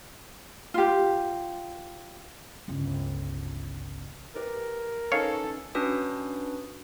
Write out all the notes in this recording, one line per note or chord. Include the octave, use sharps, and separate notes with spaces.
F4 G4
G1 C#2
G4 A#4 B4 D5
C#4 D#4 A4 B4 C#5 F5
C#4 D4 F#4 B4 D#6